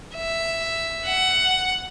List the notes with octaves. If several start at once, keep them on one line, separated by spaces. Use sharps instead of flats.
E5
F#5